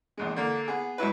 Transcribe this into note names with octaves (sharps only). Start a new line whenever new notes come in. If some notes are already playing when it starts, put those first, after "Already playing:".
A#1 E2 G#3
D3 A#3
B3 G#4
G#2 F#3 E4 B4